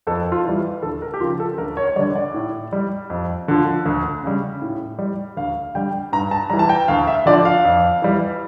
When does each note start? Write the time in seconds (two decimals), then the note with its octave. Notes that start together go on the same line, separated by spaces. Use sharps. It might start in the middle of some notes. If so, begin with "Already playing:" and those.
0.07 F2 A4
0.32 F4
0.45 E3 G3
0.83 D2 A4
1.02 A#4
1.14 G4
1.20 C#3 F3 F4
1.40 A4
1.58 D2 A#4
1.77 C#5
1.87 C#5
1.96 G3 D5
1.99 D3
2.16 D5
2.34 A2
2.73 G3
3.10 F2
3.48 D3 F3
3.86 D2
4.24 C#3 G3
4.62 A2
4.99 G3
5.37 D2 F5
5.75 D3 G3 G5
6.12 G2 A#5
6.31 A5
6.50 E3 G3 A#5
6.59 A5
6.69 G5
6.88 D2 F5
7.07 E5
7.26 D3 F3 D5
7.45 F5
7.65 F2
8.02 E3 G3